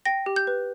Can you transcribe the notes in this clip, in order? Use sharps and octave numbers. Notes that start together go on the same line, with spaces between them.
G5 A#6
G4
G6
B4